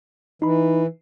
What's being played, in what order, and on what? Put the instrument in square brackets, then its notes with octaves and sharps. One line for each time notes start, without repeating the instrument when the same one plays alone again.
[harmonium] E3 [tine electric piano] D#4 B5